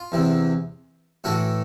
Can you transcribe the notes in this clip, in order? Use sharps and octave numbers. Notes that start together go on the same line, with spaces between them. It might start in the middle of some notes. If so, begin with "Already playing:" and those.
Already playing: F4
E2 C3 E3
A2 E3 A3 F#4